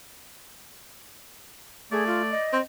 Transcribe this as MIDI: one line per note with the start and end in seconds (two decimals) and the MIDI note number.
1.92 2.33 57
1.92 2.06 68
1.92 2.48 74
2.07 2.22 65
2.31 2.60 75
2.53 2.61 60